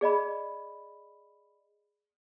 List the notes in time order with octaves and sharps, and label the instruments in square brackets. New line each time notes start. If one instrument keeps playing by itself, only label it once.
[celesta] G#4 D5 D#5 B5